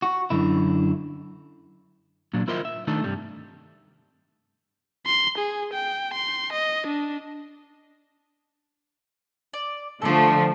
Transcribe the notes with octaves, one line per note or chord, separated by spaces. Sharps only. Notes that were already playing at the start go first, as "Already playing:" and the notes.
F#4
F#2 D3 E4
A#2 F#3 D4
E4 F4 A#4 C5 D#5 E5
E5
D#3 A3 D4 D#4 A4
G2 C3 G3
C6
G#4
G5
C6
D#5
D4
D5
D3 F3 A3 D4 A4